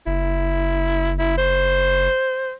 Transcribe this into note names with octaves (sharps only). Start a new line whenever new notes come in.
F#1 E4
E4
C5